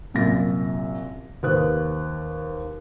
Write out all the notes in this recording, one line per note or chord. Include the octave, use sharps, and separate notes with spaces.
C2 F#2 A#2 A#6
D#2 B4 C5 D#6 F#6